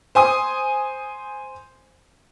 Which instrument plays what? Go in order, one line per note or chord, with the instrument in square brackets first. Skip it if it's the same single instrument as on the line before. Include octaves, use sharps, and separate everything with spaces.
[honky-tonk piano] C5 G#5 D#6